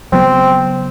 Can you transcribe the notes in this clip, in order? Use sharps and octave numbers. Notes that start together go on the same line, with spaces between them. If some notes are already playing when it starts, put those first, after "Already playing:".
C#3 F#3 B3 C4